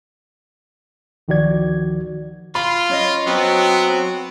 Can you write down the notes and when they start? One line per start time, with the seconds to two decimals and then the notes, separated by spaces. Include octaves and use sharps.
1.28 D2 D#3 F3 F#4 D5 G#6
2.55 F4 B5
2.89 C#4 C#5 D#5
3.27 F#3 B3 C4